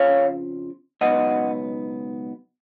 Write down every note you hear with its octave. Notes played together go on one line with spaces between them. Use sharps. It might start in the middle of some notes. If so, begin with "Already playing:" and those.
Already playing: F2 C#3 F3 C#5 F5
C#2 B2 F#3 B3 D#4 D#5 F#5